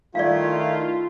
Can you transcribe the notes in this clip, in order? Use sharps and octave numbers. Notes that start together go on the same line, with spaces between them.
D#3 A3 E4 F4 D5 F5